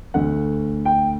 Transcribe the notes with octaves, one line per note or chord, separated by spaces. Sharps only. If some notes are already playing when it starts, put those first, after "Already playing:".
D2 D3 A3 F#5
G5